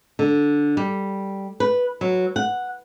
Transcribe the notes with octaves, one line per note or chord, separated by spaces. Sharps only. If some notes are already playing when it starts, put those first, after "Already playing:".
D3
G3
B4
F#3
F#5